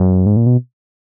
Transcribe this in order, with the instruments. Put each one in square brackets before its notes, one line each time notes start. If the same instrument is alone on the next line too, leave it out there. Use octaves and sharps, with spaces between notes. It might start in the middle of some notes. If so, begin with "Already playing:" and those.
Already playing: [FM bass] F#2
G#2
A#2
B2